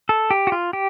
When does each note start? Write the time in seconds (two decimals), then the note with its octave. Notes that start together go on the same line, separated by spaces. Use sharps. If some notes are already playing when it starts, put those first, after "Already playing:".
0.09 A4
0.31 G4
0.47 F#4
0.52 F4
0.73 G4